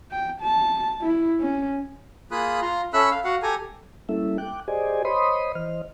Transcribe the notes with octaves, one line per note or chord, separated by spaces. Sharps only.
G5
A5
E4
C#4
A#3 F4 G#4 B5 D#6 F#6
F4 A#5 C6
C#4 A4 E5 B5 E6 F#6
F5
F#4 F5 F#5
G4 A4 G#5 A#5
G3 A#3 C#4 E4 A4 E5
G5 D6 F#6
G4 G#4 C5 D5 D#5 G#5
C5 C#5 D#5 B5 C6 D#6
E3 C5 D#5 F6